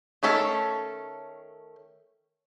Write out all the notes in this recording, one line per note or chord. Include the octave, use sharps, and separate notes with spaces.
D#3 A3 C#4 A4